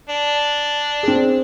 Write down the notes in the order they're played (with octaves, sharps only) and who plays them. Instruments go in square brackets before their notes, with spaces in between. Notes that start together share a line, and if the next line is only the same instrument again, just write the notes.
[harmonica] D4
[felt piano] C4 G#4